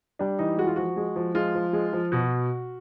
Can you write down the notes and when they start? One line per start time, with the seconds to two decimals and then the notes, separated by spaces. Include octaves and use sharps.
0.19 G3 D4
0.39 E3 D#4
0.58 G#3 F#4
0.67 F4
0.76 F3 F#4
0.97 G#3
1.16 F3
1.35 G#3 F4
1.55 F3
1.73 G#3
1.93 F3
2.12 B2 F#4